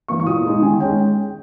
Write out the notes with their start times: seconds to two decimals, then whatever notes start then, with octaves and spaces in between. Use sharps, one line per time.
0.08 E3 A#3 C#6
0.20 C#6
0.26 A#2 D#6
0.45 G#3 D#4
0.62 D#3 G#5
0.80 G#3 C#4 G5